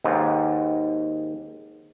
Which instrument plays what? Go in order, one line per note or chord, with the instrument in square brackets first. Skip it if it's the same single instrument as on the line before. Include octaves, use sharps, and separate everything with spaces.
[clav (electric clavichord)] D#2 G#2